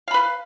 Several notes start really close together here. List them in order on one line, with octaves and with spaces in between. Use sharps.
F5 B5 B4